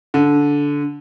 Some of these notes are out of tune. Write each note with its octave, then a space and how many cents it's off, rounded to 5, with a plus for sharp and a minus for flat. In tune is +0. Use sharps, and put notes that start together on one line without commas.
D3 -15